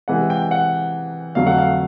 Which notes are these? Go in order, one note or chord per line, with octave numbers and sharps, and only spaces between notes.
C3 E3 G#3 F#5
G5
F#5
F2 D3 F#3 A3 F5
F#5
F5